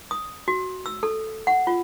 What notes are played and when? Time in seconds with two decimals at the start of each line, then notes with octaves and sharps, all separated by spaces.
0.11 D#6
0.48 F#4
0.86 E6
1.03 A4
1.47 F#5
1.67 F4